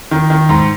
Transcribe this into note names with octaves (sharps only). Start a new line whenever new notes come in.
D#3
D#3
G#2